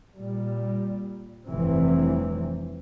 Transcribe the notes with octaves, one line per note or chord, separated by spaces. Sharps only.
A#2 G3
F1 G2 C3 E3 C4